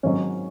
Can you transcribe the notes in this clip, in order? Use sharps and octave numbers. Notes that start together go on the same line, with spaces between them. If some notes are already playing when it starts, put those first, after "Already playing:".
G#1 G#2 D#3 F#3 C#4 C#5